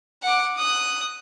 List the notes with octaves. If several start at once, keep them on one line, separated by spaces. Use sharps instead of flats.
F#5 D6
D#6 F#6